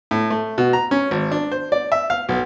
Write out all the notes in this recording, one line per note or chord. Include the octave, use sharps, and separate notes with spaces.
A2
A3
B2
A#5
C#4
G#1
D4
C5
D5
E5
F5
B1